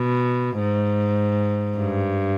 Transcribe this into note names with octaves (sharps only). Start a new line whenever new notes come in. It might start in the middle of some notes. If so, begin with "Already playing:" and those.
Already playing: B2
G#2
G2